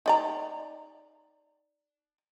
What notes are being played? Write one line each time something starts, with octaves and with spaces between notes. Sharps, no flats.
D#4 D5 A#5